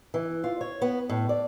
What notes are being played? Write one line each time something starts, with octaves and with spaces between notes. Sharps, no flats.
E3
F4
C#5
B3
A2
D5